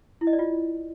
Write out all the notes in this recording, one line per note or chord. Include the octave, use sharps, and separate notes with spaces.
E4
D#5
D5
F4